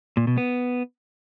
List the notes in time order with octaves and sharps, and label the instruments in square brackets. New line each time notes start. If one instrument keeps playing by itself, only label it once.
[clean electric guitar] A#2
B2
B3